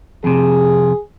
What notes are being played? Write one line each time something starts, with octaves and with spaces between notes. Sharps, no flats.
F2 C3 G#4